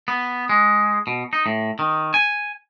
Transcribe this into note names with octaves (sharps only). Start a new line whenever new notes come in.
B3
G#3
B2
D#4
A2
D#3
G#5